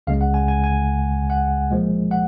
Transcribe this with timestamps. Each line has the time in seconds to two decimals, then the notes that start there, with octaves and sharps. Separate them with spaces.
0.07 C#2 C#3 G#3 F5
0.21 F#5
0.34 G#5
0.48 G#5
0.64 G#5
1.30 F#5
1.70 A#2 F3 G#3
2.11 F#5